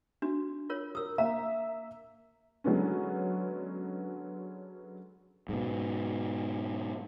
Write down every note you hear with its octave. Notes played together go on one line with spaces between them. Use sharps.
D4 F#4
F4 A#4 C#5
A#4 D#6 E6
A#3 E5 A#5
D3 F#3 G#3 B3 C#4
G#2 B2